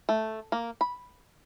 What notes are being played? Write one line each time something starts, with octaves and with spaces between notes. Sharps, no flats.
A3
A#3
B5